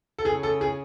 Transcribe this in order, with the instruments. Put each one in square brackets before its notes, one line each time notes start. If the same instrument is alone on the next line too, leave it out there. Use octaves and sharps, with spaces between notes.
[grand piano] A4
[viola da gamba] C#3 [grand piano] G#4
[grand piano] A4
G#4